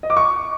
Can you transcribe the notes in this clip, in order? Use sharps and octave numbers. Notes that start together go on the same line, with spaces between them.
D#5
D6
C#6